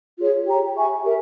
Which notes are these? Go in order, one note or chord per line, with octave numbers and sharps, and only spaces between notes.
F4 G#4 C#5
G4 C#5 G5 A#5
G#4 E5 G#5 C#6
G4 A#4 E5